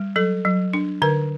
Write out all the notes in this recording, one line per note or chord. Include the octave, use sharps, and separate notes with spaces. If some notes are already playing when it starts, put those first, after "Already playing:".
Already playing: G3
F#3 A4
F#3
D4
D3 A#4